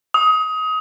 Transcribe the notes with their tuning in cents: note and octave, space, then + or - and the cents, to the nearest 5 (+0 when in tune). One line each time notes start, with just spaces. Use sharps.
D#6 +25